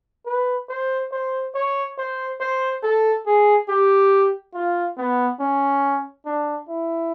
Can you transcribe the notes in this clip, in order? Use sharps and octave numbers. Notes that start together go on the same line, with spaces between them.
B4
C5
C5
C#5
C5
C5
A4
G#4
G4
F4
B3
C#4
D4
E4